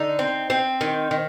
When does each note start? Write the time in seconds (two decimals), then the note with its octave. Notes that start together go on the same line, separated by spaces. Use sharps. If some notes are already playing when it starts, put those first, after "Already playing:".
Already playing: D3 D#4
0.19 C4
0.50 C4
0.81 D#3
1.11 D#3